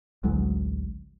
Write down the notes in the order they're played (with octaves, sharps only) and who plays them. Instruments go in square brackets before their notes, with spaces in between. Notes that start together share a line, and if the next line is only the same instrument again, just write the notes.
[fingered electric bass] A1 D2 F#3 G#3